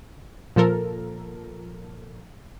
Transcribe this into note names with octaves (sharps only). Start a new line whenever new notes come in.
A#2 F3 A4 A#4